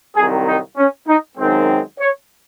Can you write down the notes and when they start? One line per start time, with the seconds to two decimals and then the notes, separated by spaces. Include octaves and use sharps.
0.16 C2 C3 D#3 F#3 G#4
0.47 D#4
0.77 C#4
1.07 D#4
1.38 F#2 D#3 G#3 C4
1.99 C#5